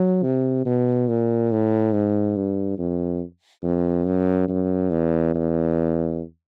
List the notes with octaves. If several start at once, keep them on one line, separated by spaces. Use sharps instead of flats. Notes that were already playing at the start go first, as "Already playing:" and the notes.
Already playing: F#3
C3
B2
A#2
A2
G#2
G2
F2
F2
F#2
F#2
E2
E2